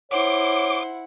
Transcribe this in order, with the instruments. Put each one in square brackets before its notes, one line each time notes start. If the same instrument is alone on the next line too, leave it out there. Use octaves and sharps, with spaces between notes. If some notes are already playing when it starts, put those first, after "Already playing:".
[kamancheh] E4 F#5 [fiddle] C5 [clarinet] C#5 [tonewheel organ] D6